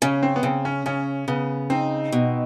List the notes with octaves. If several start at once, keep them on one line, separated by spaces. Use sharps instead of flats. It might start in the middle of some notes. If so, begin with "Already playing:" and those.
C#3 C#4
C4
B3
C#3 C4
C#4
C#3 C#4
C#3 B3
C4 D#4
B2